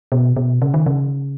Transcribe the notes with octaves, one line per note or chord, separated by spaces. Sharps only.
B2
B2
C#3
D#3
C#3